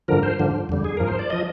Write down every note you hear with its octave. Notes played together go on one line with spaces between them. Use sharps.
G2 D3 F3 A#4
C5
G2 D3 F3
F2 D3 G3
G#4
G2 F3 A#4
C5
D5
F3 D#5